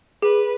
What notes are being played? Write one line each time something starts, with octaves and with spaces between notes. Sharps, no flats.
G#4 B4